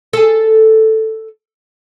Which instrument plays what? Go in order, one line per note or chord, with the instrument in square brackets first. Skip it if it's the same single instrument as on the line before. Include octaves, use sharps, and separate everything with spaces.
[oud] G#4 A4